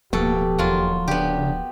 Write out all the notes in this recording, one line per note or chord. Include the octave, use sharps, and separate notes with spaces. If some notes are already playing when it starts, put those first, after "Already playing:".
D1 B2 F3 A#3 G4 A4
D#2 F#3 A#3 F4
C#3 B3 D4 G4